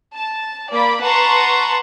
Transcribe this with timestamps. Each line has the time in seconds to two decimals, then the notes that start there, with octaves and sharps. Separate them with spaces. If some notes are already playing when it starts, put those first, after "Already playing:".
0.17 A5
0.71 A#3 D5 B5
1.03 B4 F#5 A5 A#5 C6 C#6